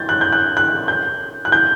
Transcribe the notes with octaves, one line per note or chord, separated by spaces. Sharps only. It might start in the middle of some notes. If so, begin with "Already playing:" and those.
Already playing: G6 A6
F#6
G6
F#6
F#6
G6
F#6
G6